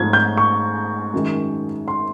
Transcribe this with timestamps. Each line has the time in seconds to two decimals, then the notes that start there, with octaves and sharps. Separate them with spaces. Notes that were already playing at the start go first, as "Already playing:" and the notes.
Already playing: G#2 F3 A3 C4 G#6
0.13 G6
0.37 C#6
1.14 F#2 D#3 G#3
1.88 C6